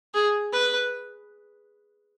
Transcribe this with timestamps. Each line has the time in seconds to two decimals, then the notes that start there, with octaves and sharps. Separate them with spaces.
0.14 G#4
0.52 B4